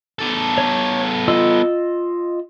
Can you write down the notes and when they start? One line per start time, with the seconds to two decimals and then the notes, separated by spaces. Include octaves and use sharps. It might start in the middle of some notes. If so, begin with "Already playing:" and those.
0.19 B3 A4
0.58 C#5
1.28 F4 D#5 E6